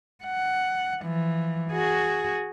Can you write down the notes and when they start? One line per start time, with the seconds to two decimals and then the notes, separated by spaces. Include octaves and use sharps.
0.24 F#5
1.02 E3 F3
1.70 F#4 G#4